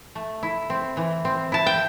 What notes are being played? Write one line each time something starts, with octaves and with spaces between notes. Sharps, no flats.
A3
E4
C4
E3
C4
E4 A5
G5